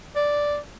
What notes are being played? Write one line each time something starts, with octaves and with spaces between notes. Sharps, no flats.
D5